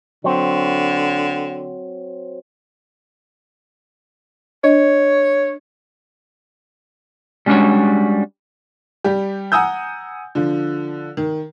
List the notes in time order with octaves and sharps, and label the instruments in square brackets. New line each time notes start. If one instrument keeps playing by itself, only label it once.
[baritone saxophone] D3 [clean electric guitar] F#3 C4
[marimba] D4 D#5 [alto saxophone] C#5
[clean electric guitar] G3 G#3 C#4 D4 F#4 C#5
[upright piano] G3 G4
F#5 G#5 A#5 D#6 E6 G6
D3 F3
D#3